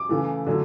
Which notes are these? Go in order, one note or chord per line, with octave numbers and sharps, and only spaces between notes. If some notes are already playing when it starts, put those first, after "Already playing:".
Already playing: D6
C#3 E3 A3
D3 F#3 A3